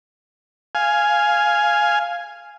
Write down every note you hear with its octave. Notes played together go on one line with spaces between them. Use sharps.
F5 G#5